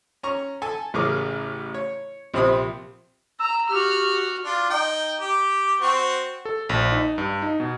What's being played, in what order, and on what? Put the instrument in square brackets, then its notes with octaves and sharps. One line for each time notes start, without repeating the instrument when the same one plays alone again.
[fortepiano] C#4 A#5 C#6
A4 G#5
A1 C#3 G#4 A#4 D6
C#5
A#1 C3 C4 B5 C6 D#6
[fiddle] A#5 [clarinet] E6
[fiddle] F#4 F6 [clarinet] G4
[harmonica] D4 F4
D#4 G5
G4
C4 F#4
[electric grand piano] A4
A#1
D#4
G2
D#4
B2